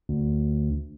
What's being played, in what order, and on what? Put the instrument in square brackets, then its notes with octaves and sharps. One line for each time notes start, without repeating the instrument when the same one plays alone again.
[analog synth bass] D2